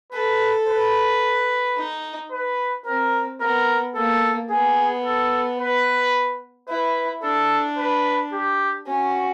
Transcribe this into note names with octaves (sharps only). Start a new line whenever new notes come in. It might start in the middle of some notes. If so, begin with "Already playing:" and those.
A4 B4
B4
D#4
B4
C4 A#4
B3 A#4
A#3 A4
B3 G#4
A4
B4
E4 B4
D4 A4
B4
G4
C#4 F#4